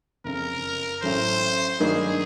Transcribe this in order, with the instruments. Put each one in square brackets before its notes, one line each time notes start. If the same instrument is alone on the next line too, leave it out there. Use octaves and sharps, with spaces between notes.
[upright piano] F#1 F2 C#3 [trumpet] A#4
[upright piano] A1 A2 F#3 A3 [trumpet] C5
[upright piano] G2 D#3 F#3 A#3 D#4 [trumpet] G#4